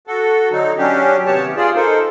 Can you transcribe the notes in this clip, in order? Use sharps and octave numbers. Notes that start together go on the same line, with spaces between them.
F#4 A4
D3 F#3 D#4
F#3 C#4 D4 G4
D#2 C3 B3 G4 C#5 A5
F4 G#4 D5
D#4 A4 A#4 C5